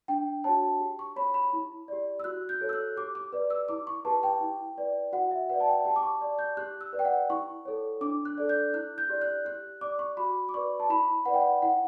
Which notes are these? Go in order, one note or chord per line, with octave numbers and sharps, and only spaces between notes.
D4 G5
F#4 C#5 A5
G4
C#6
C#5 B5
B5
E4
G4 D5
E6
F#4 F#6
G6
A4 C#5
E6
F#6
G4 D6
D6
B4 D5
E6
E4 D6
C#6
G4 B4 A5
G5
E4
B4 D5
F#4 F#5
E5
B4 D5 F#5
A5
G5
G4 A5
D6
C#6
D5
G6
G4 F#6
E6
B4 D5
G5
F#5
E4 C#6
A4 C#5
D4 D6
F#6
A4 D5
G6
E4 F#6
G6
G4 D5
F#6
G4 F#6
D5 D6
C#6
F#4 B5
D6
B4 D5 C#6
A5
E4 B5
B4 D5 F#5
G5
F#5
E4 F#5